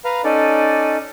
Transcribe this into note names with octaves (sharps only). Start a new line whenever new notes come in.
B4 F5 A#5
C#4 D#4 A4 D5